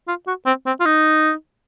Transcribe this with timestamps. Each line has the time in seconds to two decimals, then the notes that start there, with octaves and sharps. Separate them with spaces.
0.08 F4
0.27 F#4
0.46 C4
0.66 C4
0.80 F4
0.85 D#4